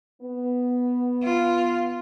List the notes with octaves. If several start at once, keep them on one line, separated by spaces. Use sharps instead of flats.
B3
F4